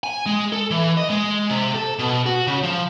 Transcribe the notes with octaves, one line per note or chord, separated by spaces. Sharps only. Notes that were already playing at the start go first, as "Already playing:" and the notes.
G#5
G#3
A4
E3
D#5
G#3
C3
A4
B2
F#4
C#3
F3